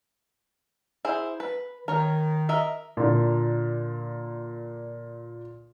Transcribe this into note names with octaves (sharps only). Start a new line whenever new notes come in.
E4 G#4 C5
B4
D#3 A#4 C#5
A#4 D#5 E5
A#2 D3